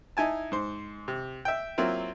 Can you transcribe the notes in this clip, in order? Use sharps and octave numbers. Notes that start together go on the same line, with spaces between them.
D#4 E4 G#5 A5
G#2 C5
C3
E5 G5
F#3 A#3 C4 E4 F4